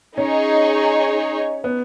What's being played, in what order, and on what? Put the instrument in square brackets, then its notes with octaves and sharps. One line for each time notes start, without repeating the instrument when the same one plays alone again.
[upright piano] C#4 [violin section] D#4 G#4 C#5
[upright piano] B3